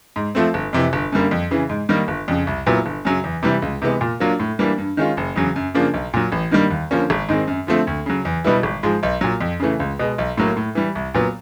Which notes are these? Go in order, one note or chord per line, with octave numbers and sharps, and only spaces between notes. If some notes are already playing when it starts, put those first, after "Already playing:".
G#2
F3 A3 C4
G1
F2 C3 E3
G1
F#2 D3 G3 A#3
F2
C#3 E3
G#2
D#3 G3 A#3
G1
F2 C#3
C2
A#2 F#3 B3 E4
G1
F#2 C#3 F#3
E2
C3 E3 G3
C#2
C3 E3 G#3 B3
A#2
F#3 A#3 D4 F4
A2
E3 G3 A#3 D4
G2
D#3 G#3 C#4 F4
F#1
E2 C#3 F#3
F#2
C#3 F3 A#3 D4
B1
A#2 F#3
A1
G2 D#3 G3 A#3
D#2
D3 F3 A#3 C#4
G#1
G#2 D#3 G#3 C4
F#2
D3 F3 A3 C4
D2
C#3 F#3
E2
B2 G3 B3 E4
G#1
G#2 F3 G#3
B1
A#2 F#3
F2
C#3 E3 A3
C#2
B2 G#3
B1
A2 F#3 A#3
A2
E3 G3
C2
A#2 F#3 B3